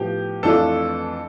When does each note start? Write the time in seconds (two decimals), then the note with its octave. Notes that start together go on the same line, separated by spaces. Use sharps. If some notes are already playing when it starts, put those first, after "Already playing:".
Already playing: A2 F3 B3 G4
0.43 F2 E3 A3 D4 F4 A4